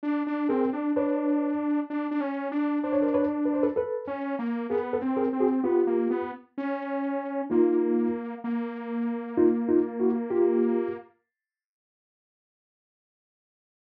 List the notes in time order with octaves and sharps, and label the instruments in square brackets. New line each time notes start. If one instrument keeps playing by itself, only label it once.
[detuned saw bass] D4
D4
[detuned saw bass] C4 [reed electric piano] G#4 A#4
[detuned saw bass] D4
[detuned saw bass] D4 [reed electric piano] B4 C#5
[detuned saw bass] D4
D4
C#4
D4
[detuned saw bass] D4 [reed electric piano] C5
[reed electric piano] C#5
A#4 C5
B4 C#5
B4
C5
A4 B4
A4 B4
[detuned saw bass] C#4
A#3
[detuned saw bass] B3 [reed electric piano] G#4 A#4
[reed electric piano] A4 B4
[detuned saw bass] C4
[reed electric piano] G#4 A#4
[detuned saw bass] C4
[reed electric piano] F#4 G#4
[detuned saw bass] B3 [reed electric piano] F4 G4
[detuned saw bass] A#3
B3
C#4
[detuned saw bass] A#3 [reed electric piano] D#4 F4
[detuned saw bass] A#3
[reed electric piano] D#4 F4
D#4 F4
E4 F#4
F4 G4